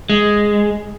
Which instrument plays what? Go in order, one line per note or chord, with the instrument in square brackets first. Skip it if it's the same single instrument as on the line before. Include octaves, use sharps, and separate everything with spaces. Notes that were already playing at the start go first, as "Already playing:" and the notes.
[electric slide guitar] G#3